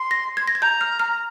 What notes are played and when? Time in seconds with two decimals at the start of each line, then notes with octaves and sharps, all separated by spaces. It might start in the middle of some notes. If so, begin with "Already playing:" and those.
Already playing: C6
0.11 A#6
0.37 G#6
0.48 A#6
0.55 G#6
0.62 A#5 G6
0.81 F6
1.00 F6